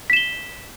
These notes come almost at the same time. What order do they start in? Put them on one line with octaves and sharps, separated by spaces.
B6 E7 G7